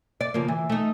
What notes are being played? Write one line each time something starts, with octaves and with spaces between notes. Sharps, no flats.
D5
C#3 F3 A#3
E3
A3 D#4